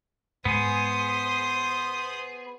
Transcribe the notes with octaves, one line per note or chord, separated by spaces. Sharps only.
G#2 G#3 B3 G#4 C5 D#6